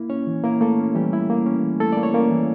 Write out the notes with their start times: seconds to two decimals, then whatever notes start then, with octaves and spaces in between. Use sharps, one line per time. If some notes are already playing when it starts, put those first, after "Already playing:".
Already playing: A#3 E4
0.10 C#4 C#5
0.27 E3
0.44 A#3 E4 A#4
0.61 A3 A#3 A4
0.79 C#4
0.95 E3 G3 G4
1.13 E4
1.30 A#3
1.46 C#4
1.63 E3
1.80 A3 E4 A4
1.92 A#3 D5
2.03 C#5
2.14 A#3 C#4 A#4
2.31 E3